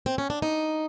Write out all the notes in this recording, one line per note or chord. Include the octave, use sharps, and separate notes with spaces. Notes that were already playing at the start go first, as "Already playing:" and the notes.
C4
C#4
D4
D#4